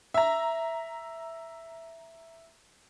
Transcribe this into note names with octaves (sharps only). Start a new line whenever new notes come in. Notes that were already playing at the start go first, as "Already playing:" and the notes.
E5 A#5